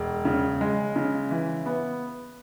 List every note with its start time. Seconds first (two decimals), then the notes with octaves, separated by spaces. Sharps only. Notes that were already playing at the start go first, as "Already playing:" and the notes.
Already playing: E1
0.25 C#3
0.61 G#3
0.96 C#3
1.31 E3
1.66 B3